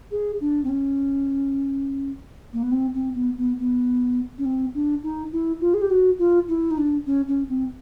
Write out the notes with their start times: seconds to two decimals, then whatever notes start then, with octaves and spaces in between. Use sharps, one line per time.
0.11 G#4
0.41 D4
0.64 C4
0.69 C#4
2.53 A#3
2.63 B3
2.71 C4
2.94 C4
3.15 B3
3.38 B3
3.59 B3
4.38 C#4
4.45 C4
4.75 D4
5.03 D#4
5.32 E4
5.61 F4
5.74 G#4
5.81 G4
5.90 F#4
6.19 F4
6.48 E4
6.71 D#4
6.77 D4
7.06 C#4
7.28 C#4
7.49 C4